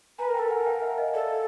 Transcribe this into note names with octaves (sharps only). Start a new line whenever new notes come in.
B4 G#5 A#5
A#4
G5 A5
A4
A#4 F#5 G#5
G#5
F5 G5
E5 F#5
D#5 F5
A4 D5 E5